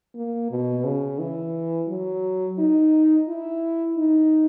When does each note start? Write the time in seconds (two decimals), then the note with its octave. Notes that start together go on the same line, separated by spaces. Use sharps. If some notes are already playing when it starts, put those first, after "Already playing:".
0.15 A#3
0.50 B2
0.85 C#3
1.19 E3
1.89 F#3
2.59 D#4
3.29 E4
3.97 D#4